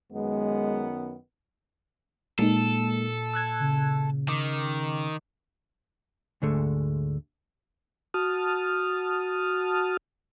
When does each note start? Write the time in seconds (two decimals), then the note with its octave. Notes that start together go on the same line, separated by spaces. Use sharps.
0.13 F#2 D#3 G#3 B3
2.39 A#2 G#3 A#3 D#4 A4
3.34 E6 F#6 G#6
3.60 C#3
4.28 D#3 D6
6.42 D2 G#2 D3 G#3 A3
8.14 F#4 A5 D#6 F6